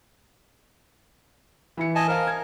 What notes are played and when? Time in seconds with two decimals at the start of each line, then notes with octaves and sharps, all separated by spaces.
1.77 E3 E4 C#7
1.95 D#5 G#5 A5
2.08 A#4 C5 F5 G#5
2.27 G#6